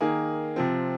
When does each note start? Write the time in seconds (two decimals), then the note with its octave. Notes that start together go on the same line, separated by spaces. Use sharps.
0.01 D#3 A#3 G#4
0.56 C3 F3 C4